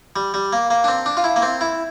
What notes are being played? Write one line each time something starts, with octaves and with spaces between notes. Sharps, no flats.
G3
G3
A#3
A#3
D4
C4
D4
F4
E4
A#3
C4
E4